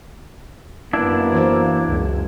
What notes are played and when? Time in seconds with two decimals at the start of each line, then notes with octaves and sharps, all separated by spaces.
0.93 F#2 A#3 B3 D4 E4
1.33 E3 F#4 C5
1.87 C#2 F#2